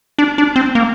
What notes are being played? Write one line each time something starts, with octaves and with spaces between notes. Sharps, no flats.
D4
D4
C4
A#3